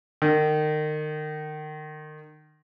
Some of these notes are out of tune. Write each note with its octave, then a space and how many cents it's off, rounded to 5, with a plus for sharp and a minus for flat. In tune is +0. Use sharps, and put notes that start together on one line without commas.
D#3 -30